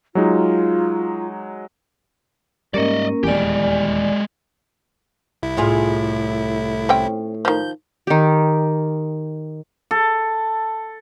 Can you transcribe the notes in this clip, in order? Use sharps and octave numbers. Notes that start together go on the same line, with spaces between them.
F#3 G#3 D#4 F4
G#2 G3 A#3 C#4 A#4 D5 D#5
D#1 G#1 E2 G#3 G4 D5 G#5
C2 E4
A2 F4 G#4
C4 C#4 G5
D#3 F3 G6
D#3 G4
A4